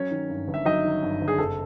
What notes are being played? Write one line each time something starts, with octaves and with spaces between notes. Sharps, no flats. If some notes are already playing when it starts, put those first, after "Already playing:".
Already playing: F#3 C#4 C#5
D#3
G2
G1
E5
F#3 D#4 D#5
D#3
G2
G1
G#4
F#1 A4